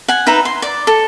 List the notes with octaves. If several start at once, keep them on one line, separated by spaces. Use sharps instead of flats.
F#5 G#5
D#4 B4 E5 A#5
C6
D5
A4